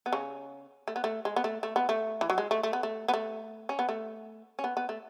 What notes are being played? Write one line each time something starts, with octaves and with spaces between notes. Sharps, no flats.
B3
C#3 C#4
A3
B3
A3
G#3
B3
A3
A3
B3
A3
E3
F#3
G#3
A3
A3
B3
A3
B3
A3
C#4
B3
A3
C#4
B3
B3
A3